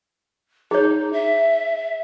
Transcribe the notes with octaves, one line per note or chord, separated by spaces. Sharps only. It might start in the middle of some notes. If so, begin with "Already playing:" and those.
D#4 G#4 C#5
E5